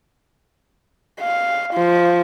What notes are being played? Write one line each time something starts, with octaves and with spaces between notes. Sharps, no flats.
F5
F3